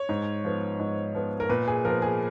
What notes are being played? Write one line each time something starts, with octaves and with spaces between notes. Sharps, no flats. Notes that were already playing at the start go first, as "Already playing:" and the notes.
Already playing: C#5
G#2
F3 B3
G#2
F3 B3
A#4
A#2 B4
G#4
F3 B3 A#4
G#4